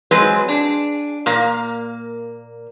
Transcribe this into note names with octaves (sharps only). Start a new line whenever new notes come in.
F#3 G#3 C4 B4
D4 G#4
A#2 A#3